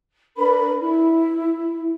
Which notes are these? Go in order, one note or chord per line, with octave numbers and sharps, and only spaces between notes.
D4 A#4 B4 B5
E4